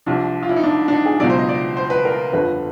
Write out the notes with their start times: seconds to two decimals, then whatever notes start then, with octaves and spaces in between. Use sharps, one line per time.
0.06 C2 C3 F3 D4
0.43 F4
0.49 E4
0.56 D#4
0.63 D4
0.88 D4
0.92 D#4
1.06 G#4
1.20 C#2 B2 F#3 D5
1.30 C5
1.39 D#5
1.49 D5
1.77 C5
1.90 B4
2.05 A#4
2.33 G1 F2 D3 B4